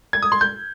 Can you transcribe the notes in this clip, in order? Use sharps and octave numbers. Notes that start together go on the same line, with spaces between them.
G#6
D#6
C6
G6